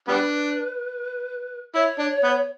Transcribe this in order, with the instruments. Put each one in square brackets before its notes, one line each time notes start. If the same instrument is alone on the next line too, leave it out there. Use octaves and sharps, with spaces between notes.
[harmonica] G3 B3 D4 [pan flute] B4
[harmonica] E4 [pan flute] C#5
[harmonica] D4
B3